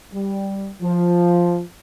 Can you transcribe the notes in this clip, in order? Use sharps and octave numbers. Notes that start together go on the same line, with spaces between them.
G3
F3